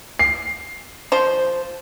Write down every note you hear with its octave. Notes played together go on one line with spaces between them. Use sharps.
C7
F3 C5